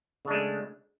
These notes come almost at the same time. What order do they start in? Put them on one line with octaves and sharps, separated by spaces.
C#3 D4 G#3 A3